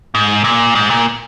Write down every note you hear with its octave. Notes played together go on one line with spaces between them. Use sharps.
G#2
A#2
G#2
A#2